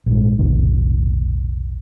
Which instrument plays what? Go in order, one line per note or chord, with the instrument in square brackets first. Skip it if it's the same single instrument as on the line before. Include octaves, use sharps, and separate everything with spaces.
[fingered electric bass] A#1 G#2
F1 B1 A2 D#3